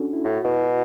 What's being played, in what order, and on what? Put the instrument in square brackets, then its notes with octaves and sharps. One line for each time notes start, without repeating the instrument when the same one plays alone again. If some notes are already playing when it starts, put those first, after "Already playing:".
Already playing: [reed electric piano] C#4 D4 F#4 A4
E4
[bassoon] A2 [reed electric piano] F#4
[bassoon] B2 [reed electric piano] E4
[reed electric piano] F#4